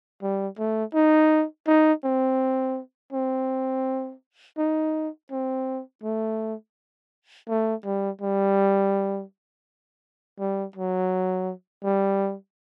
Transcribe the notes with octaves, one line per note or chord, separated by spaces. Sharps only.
G3
A3
D#4
D#4
C4
C4
D#4
C4
A3
A3
G3
G3
G3
F#3
G3